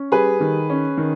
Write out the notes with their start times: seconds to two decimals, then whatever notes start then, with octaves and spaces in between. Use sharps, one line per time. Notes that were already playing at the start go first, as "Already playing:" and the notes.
Already playing: C#4
0.12 G3 G#4 B4
0.40 D#3
0.70 C#4
0.97 D#3